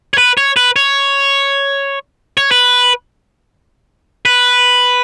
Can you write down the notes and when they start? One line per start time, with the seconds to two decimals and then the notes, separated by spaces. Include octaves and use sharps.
0.14 C#5
0.18 B4
0.37 C#5
0.57 B4
0.76 C#5
2.37 C#5
2.51 B4
4.25 B4